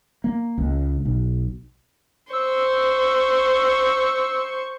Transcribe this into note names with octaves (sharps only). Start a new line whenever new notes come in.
A#3
C#2
B1
C5 C#6 E6